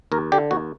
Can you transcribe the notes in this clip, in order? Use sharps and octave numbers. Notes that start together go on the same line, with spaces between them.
D#2 A#4
D3 G4
D#2 F#4